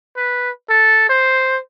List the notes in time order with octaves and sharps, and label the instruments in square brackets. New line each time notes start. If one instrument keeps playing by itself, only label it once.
[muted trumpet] B4
A4
C5